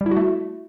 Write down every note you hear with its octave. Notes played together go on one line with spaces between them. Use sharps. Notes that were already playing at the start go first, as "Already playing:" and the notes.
G3
E4
F#4
A3